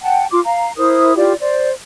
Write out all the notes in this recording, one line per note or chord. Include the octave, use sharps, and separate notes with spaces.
F#5 G5 A5
F4 C6 D6
F5 A#5
E4 A#4 C5 D#6
E4 F4 G4 D5
C5 D5